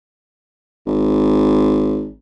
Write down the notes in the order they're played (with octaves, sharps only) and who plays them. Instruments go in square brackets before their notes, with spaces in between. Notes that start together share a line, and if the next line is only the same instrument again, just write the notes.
[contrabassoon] G#1